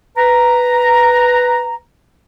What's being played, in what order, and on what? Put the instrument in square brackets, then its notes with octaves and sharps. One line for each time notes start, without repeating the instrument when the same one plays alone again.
[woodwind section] B4 A#5